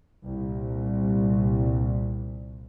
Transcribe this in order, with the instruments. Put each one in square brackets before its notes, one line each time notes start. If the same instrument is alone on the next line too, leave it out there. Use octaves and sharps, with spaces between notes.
[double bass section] C2 A#2